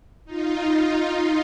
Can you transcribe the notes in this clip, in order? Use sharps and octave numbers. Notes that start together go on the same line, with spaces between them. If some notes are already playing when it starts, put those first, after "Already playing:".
D#4 F4